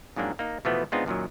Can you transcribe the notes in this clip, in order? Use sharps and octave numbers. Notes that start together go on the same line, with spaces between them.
F2 G#2 F#3 A#3 D4
A#3 D#4
B2 E3 F3 A3 B3
G#3 B3 C4 D4 D#4 F4
F#2 A#2 D#3 F#3